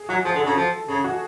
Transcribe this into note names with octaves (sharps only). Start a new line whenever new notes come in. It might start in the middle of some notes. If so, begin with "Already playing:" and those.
Already playing: G#4
F#3 F#4
F3 G#4
D3 A4
C#3 A4
F3 A4
C#3 G#4
F#4